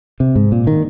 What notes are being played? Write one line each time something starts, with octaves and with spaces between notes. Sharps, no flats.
C3
G#2
A#2
D#3